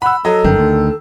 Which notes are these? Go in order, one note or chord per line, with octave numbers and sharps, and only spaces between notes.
F#5 B5 E6
F#3 A4 D#5
G1 F#2 D#3
D2